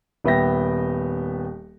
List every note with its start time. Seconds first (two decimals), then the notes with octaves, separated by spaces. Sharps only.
0.24 D#1 B3 E5 G5 A#6